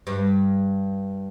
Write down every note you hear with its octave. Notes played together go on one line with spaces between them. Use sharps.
G2